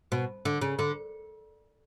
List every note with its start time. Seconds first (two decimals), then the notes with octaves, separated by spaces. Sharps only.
0.12 B2
0.45 D3
0.61 C#3
0.79 D3